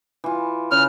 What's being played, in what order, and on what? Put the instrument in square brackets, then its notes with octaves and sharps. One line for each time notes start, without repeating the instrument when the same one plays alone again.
[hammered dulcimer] E3 F4
[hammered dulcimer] C#3 [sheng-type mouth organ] F6